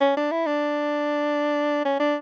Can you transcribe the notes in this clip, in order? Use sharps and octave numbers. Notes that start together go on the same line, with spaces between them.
C#4
D4
E4
D4
C#4
D4